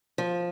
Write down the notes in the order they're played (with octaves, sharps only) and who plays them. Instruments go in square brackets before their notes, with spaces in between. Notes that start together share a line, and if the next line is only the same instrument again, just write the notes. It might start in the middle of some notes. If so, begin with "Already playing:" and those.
[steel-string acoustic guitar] F3